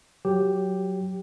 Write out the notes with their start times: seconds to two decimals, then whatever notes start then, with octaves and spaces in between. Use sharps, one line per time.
0.25 F#3 G4